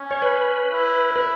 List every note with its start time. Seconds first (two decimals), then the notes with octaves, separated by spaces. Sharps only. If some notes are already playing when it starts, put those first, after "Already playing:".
Already playing: C#4
0.11 C#5
0.22 B4
0.72 E4
1.16 B4